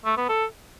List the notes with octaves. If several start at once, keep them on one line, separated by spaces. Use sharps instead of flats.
A3
B3
A4